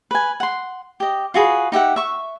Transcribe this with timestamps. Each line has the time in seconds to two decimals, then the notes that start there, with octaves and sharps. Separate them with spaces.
0.11 B4 G#5
0.40 F#5 C6
1.00 G4 D#5
1.34 F4 F#4 G#4 B4
1.72 D#4 G4 E5 F#5
1.96 E5 C#6